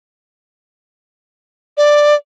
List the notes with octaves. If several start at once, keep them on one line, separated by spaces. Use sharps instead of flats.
D5